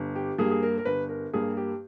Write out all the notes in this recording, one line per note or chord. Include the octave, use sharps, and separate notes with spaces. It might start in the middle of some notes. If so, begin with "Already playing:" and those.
Already playing: G1
G4
G2 G3 A#3 G#4
G#4
A#4
A#4
G1 B4
A#4
G2 G3 A#3 G#4
G4